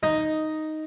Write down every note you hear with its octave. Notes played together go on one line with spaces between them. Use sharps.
D#4